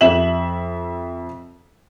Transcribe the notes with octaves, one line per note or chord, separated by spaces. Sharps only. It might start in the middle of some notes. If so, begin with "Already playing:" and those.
F2 E5 E7 F#7